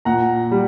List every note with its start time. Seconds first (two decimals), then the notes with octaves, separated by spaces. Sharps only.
0.05 A#2 F#5 A#5
0.51 G3